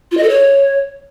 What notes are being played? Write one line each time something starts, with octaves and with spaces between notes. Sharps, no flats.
F4
D#5
A4
C#5